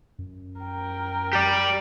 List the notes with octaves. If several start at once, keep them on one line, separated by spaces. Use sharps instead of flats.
F#2
A#4 G5
G4 D5